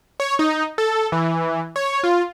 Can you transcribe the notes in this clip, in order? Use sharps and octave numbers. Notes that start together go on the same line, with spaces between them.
C#5
D#4
A4
E3
C#5
F4